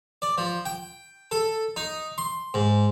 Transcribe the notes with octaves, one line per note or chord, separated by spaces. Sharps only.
D5
F3
G5
A4
D#4
C6
G#2